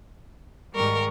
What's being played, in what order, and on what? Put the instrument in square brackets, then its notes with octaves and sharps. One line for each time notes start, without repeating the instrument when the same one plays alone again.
[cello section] G#2 D#3 G3 [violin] A#4 [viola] C#6